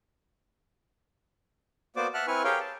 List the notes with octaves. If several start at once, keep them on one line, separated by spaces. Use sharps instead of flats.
A#3 B3 F#4 C5 D5 D6
E5 F#5 A5 F6 F#6
C4 E4 B4 G#5 C#6 F6
G4 G#4 A#4 C#5 F5 G5
A5